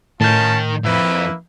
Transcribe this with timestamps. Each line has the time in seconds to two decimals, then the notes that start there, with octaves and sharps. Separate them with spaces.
0.21 A2 D#3 C#4 F4 A5 G6
0.84 F2 G#2 A#3 E4 B4